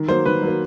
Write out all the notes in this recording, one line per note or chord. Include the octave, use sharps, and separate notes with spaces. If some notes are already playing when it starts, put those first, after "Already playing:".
Already playing: D#3
F#3 A#3 C5
D#3 B4
F#3 A#3